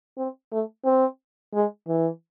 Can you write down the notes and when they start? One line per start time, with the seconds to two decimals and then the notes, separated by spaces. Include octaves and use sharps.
0.18 C4
0.52 A3
0.85 C4
1.54 G#3
1.88 E3